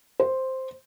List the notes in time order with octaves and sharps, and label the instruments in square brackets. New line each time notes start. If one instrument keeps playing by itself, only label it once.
[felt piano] C5